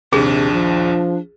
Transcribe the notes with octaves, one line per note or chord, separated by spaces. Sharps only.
A#1 D#2 C3 D4 G#4
F3